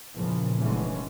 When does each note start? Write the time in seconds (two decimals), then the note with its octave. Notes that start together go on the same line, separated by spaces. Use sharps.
0.15 A#1 E2 A#2 C#3 E3 F3
0.58 F1 D3 E3 G3 G#3 C#4